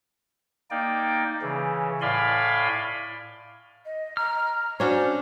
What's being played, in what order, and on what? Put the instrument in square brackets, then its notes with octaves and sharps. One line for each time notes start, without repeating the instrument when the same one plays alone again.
[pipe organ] A#3 D#4 D5 G5
C#3 E3
A2 D5 F5 G#5 B5 C6
[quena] D#5
[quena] A#5 [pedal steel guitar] F6
[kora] C#4 D4 F#4 [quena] C5